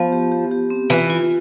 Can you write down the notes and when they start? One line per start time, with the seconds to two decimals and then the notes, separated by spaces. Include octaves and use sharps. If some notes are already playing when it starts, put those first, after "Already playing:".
Already playing: F3 B3
0.12 G4
0.32 G4
0.51 G4
0.70 C4
0.90 E3 F4
1.10 F4